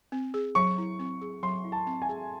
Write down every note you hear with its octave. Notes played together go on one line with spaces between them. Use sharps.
C4
G#4
F#3 C#6
E4
C4
G#4
F#3 C6
E4
A5
C4
G#5
G#4